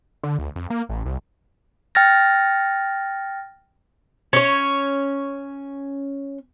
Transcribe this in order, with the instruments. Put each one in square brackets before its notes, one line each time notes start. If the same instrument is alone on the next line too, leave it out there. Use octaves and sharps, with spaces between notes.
[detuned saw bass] D3
D2
F2
A#3
A1
C2
[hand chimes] G5 F6 A6 A#6
[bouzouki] C#4 C#5